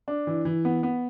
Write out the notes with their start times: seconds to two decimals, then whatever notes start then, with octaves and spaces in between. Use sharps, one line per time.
0.08 D4
0.27 E3
0.45 E3
0.65 B3
0.83 B3